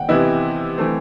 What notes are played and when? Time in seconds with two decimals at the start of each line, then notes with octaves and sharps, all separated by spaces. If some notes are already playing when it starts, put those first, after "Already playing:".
Already playing: F#5 G5
0.08 C3 E3 B3 E4 D#5
0.78 E3 A3 C4